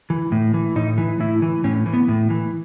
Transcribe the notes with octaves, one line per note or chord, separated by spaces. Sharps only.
E3
A2
E3
A2 D#4
E3
A2 E4
E3
A2 C#4
E3
B3
A2
E3